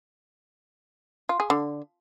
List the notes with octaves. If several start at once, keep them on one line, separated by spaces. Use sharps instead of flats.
F4
G#4
D3